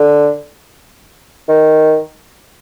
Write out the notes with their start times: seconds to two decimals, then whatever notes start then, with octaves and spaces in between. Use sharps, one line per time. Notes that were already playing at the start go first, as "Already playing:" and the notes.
Already playing: D3
1.49 D#3